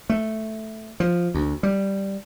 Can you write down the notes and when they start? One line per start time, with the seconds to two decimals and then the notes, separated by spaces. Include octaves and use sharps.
0.10 A3
1.00 F3
1.34 D2
1.63 G3